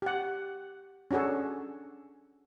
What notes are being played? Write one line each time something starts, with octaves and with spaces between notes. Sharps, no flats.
G4 F#5
C#4 D4 F#4 G#4 A4